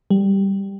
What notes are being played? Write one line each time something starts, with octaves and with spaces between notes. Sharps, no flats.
G3